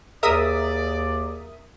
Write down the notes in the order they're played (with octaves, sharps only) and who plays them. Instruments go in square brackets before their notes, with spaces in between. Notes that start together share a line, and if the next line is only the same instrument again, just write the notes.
[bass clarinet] D#2 [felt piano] G#4 [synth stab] A#4 E5 D#6 [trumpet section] D5